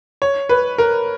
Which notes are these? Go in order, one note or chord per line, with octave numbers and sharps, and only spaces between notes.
C#5
B4
A#4